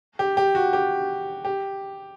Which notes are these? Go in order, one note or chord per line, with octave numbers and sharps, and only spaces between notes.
G4
G4
F#4
G4
G4